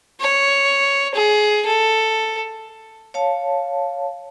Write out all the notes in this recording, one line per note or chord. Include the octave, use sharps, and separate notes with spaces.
C#5
G#4
A4
C#5 F5 A5